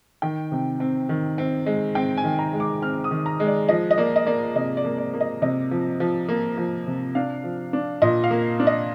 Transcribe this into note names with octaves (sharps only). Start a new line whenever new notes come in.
D#3 G5
C3
C4
D#3
C4
G#3
C4 G5
G#5
D#3
A#5
G#3
D6
C4 F6
D#6
D#3
A#5
G#3
D5
F3 D#5
D#5
A#3 D5
D#5
A#3 D5
C3 D#5
D5
A#3
D5
A#3
D#5
C3 D#5
F3
F3
A#3
F3
C3
D4 F5
F3
D4
A#2 D#5
F5
A#3
D4
D#5